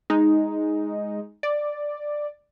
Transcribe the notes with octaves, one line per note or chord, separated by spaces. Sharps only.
G#3 D#4
D5